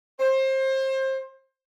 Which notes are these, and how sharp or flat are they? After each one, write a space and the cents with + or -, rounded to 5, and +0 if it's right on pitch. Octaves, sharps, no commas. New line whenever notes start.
C5 +25